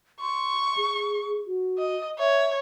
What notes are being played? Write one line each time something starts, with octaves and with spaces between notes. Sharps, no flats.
C6 C#6
G#4
F#4
D#5
C#5 E5